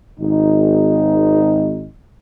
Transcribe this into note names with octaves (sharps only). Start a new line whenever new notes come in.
G#1 D#4